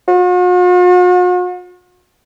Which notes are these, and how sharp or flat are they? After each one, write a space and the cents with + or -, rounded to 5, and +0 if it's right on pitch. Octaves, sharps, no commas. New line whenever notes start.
F#4 -45